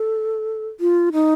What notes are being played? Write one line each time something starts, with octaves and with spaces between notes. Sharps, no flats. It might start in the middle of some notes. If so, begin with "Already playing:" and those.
Already playing: A4
F4
D#4